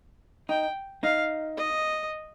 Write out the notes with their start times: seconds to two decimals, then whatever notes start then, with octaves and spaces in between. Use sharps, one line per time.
0.49 D#4 G5
1.03 D#4 F5
1.57 D#5